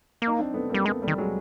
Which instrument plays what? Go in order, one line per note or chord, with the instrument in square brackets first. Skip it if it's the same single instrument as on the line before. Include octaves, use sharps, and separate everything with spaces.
[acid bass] A#3
[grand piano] D#4
C4 D4
A3 B3
[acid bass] G3 [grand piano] A#3 C4
[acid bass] G#3 [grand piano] A3 B3
[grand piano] G3 A3
[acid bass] D#3
[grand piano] F#3 G#3